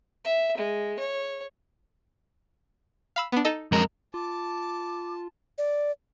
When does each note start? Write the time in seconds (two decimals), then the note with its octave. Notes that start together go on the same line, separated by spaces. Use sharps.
0.25 E5
0.57 G#3
0.99 C#5
3.16 F5 B5 E6
3.32 B3 D4
3.45 D#4 A4 D#5
3.72 F2 G#3 A#4
4.14 F4 A5 D6
5.58 D5